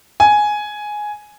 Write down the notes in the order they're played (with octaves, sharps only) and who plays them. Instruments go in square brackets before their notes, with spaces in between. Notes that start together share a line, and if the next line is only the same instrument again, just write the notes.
[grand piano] G#5